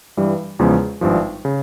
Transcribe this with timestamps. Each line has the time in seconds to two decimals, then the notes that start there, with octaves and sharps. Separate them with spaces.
0.17 G2 E3 G3
0.59 E2 C#3 F3 G#3 C#4
1.01 G#1 G2 F3
1.45 C#3